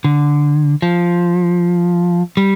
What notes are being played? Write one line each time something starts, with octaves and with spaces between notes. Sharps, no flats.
D3
F3
G3